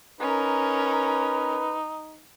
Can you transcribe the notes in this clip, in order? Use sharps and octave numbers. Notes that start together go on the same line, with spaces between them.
C#4 D#4 A#4 B4